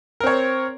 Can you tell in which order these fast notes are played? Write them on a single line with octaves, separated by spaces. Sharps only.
A#4 C4 C#5